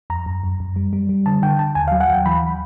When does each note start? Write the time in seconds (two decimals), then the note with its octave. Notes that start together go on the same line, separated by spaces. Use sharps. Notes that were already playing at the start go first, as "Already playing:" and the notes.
0.10 F2 A#5
0.26 F#2
0.43 F#2
0.60 F#2
0.76 G3
0.93 G3
1.09 G3
1.26 D3 A5
1.42 D3 G5
1.59 D3 A5
1.75 D#2 G#5
1.88 F#3 F5
2.00 F#5
2.09 D#2 G5
2.26 E3 B5